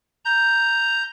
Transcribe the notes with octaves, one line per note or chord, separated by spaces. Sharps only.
A#5 G6